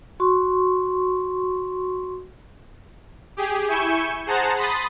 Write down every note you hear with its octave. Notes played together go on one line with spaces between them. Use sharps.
F#4 C6 C#6
G4 G#4
E4 G#5 C#6 G6 C#7 E7
G#4 C5 F#5 A5 A#5
B5 C6 D#6 A6